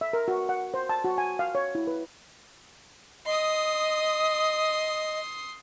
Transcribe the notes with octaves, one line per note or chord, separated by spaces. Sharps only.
E5
A#4
F#4
F#5
C5
A5
F#4
G#5
F5
C#5
E4
B4
D#5 C6 D#6